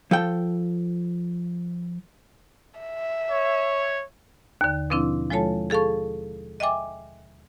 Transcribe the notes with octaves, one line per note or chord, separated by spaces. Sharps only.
F3 A4 G5
E5
C#5
D#2 D3
B2 F3 C4 D4 E4
F3 G#3 F4 A4 C#5 A5
G#4 A4 F5 A5 C#6
D#5 E5 G5 G#5 D6